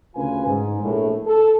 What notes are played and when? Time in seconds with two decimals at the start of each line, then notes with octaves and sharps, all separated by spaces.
0.15 D2 C#3 C#4 F4 B4 G#5
0.46 G#2
0.81 A#1 A2
1.27 A4